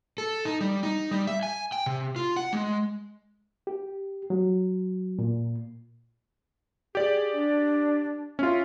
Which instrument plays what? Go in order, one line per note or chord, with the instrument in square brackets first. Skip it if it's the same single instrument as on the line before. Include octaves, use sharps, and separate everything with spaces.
[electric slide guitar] A4
D#4
G3
D#4
G3
E5
G#5
G5
C3
F4
F#5
G#3
[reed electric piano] G4
F#3
A#2
[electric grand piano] G4 D5 [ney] G#4
[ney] D4
[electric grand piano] C#4 F4 [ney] E5